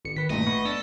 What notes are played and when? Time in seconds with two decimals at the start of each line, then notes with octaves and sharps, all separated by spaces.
0.05 G#1 C#7
0.17 D#3 B4 B6
0.30 G#1 G2 A#2 A3 D#5
0.47 B3 B5 C#6
0.65 D4 A4